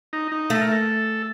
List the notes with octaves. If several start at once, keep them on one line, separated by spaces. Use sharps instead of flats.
D#4
D#4
A3 A4
A#4
A4